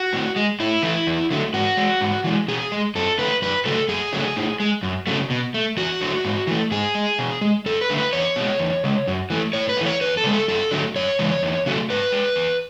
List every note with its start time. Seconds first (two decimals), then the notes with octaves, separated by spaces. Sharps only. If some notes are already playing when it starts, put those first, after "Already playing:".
Already playing: F#4
0.13 A2
0.36 G#3
0.60 A2 E4
0.83 E3 A3
1.07 E2
1.31 D3 F#3 A3
1.54 G#2 F#4
1.77 G#3
2.01 G#2
2.24 E3 G#3
2.48 B2 G#4
2.72 G#3
2.95 F#2 A4
3.18 D3 A3 B4
3.42 F#2 B4
3.65 C#3 F#3 A3 A4
3.88 F#2 G#4
4.13 C#3 F#3 A3
4.36 A2
4.60 G#3
4.83 F#2
5.07 C#3 F#3 A3
5.30 B2
5.54 A3
5.77 E2 F#4
6.01 D3 F#3 A3
6.24 G#2
6.47 E3 A3
6.71 G#2 G#4
6.95 G#3
7.19 B2
7.41 G#3
7.66 F#2 A4
7.81 B4
7.90 D3 A3
7.98 B4
8.13 E2 C#5
8.36 B2 G#3
8.59 E2
8.84 C#3 G#3
9.07 F#2
9.30 E3 A3
9.53 A2 C#5
9.69 B4
9.77 E3 A3
9.86 C#5
10.01 E2 B4
10.17 A4
10.24 C#3 G#3
10.33 A4
10.48 F#2 A4
10.71 D3 F#3 A3
10.96 F#2 C#5
11.19 C#3 E3 G#3
11.43 E2
11.66 C#3 F#3 A3
11.90 G#2 B4
12.12 G#3
12.36 E2